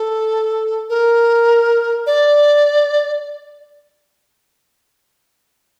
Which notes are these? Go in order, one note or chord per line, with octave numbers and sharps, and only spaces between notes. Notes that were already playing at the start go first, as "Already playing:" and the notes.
Already playing: A4
A#4
D5